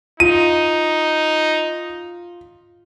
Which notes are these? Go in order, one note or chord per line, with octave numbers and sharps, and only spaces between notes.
D#4 F4 D#7